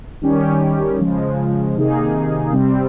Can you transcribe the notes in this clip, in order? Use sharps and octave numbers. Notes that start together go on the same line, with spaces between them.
D#3 G3 C#4 G4
C#3 F3 G#3
C3 D#3 A#3 D#4 G#4
C3 G3 C4